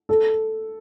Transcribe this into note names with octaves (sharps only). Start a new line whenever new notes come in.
A4